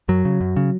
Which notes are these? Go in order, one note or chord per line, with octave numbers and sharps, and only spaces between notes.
F#2 F#3
C#3
F#2
C#3